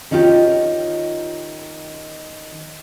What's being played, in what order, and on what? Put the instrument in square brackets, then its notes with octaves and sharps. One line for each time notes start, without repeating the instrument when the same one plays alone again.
[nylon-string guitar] D#3 C#4 D#4 F4 G4